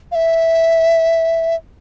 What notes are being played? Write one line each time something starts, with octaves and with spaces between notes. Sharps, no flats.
F5
E5